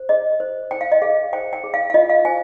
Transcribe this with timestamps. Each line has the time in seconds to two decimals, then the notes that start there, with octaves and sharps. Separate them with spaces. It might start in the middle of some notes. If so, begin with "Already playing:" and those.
Already playing: C5
0.09 G#4 D#5
0.40 C5
0.71 C5 G5
0.81 F5
0.92 D#5
1.02 G#4 F5
1.33 C5 G5
1.53 G5
1.64 G#4
1.74 F5
1.90 F5
1.94 F4 D#5
2.10 F5
2.25 C5 G#5